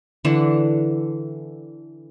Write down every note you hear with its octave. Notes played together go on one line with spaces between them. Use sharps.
D3 E3